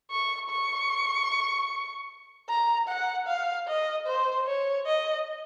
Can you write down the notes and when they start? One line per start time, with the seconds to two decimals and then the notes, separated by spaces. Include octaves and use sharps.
0.11 C#6
0.50 C#6
2.49 A#5
2.88 F#5
3.27 F5
3.68 D#5
4.06 C5
4.46 C#5
4.86 D#5